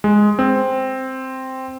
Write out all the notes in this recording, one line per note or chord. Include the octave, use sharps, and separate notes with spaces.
G#3
C4